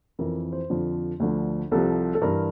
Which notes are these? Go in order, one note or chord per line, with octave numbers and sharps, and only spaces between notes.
F2 E3 A#4
C5
F2 D3 F3
D2 D3 F3
C2 C3 F3 A4
A4
G2 E3 A#4